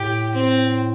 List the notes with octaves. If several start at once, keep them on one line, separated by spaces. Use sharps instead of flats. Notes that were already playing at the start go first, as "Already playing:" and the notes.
Already playing: A2 G4
C4